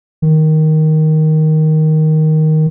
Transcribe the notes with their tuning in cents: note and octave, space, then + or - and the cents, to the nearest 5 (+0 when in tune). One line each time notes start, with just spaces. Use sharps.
D#3 +5